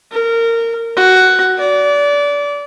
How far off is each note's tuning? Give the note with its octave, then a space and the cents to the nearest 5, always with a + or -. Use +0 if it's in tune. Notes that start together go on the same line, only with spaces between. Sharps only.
A#4 -20
F#4 +10
D5 -25